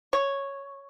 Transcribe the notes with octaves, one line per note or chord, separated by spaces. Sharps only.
C#5